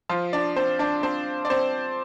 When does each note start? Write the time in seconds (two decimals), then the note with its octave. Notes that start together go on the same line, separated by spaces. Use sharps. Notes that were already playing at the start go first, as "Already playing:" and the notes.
0.09 F3 F4
0.33 D4 D5
0.56 C4 C5
0.79 D4 D5
1.03 C4 C5
1.45 D5
1.50 C4 C5